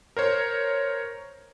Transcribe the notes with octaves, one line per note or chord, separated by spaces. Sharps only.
A#4 C5 C#5